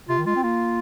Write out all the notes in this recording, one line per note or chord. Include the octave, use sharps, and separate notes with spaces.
C3 F4
D#3
G#3 F4
C4
A#3 F4